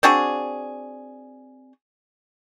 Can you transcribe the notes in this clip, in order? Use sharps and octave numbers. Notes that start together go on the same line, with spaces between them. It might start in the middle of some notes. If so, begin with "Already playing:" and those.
C4 D4 F#4 G#4